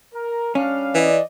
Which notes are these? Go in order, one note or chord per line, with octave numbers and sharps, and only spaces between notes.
A#4
G3 C#4 D4 F5
E3 D5 D#5